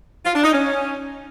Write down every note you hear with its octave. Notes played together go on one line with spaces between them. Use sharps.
F4
D4
D#4
C#4